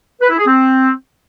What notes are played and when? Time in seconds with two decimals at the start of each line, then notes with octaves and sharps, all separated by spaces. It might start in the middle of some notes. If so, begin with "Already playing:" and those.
0.21 B4
0.30 E4
0.38 G#4
0.47 C4